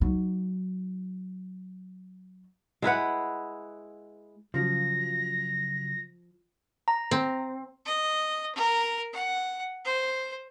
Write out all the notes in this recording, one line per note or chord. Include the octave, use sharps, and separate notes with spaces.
F#3 D#4
G#3 E4 B4 F#5
C#3 F3 F#3 F4 A#6
A#5
C4
D#5
A#4
F#5
C5